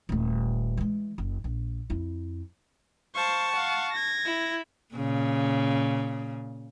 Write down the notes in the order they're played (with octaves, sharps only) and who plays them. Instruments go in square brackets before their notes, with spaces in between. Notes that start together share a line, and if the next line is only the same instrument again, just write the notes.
[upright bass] D#1 A3
E3 G#3
F#1
A#1
F2 E4
[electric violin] C5 F5 [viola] A5 C#6
[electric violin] F5 F#5
G#6 A#6
[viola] E4
[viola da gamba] A#2 C#3